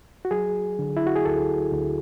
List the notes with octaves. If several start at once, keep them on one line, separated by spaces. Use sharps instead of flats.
F#4
F#3 G#4
D3
E4
F#4
G#4
D2 A4
D2